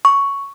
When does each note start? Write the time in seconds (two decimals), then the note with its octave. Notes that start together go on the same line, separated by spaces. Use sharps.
0.05 C#6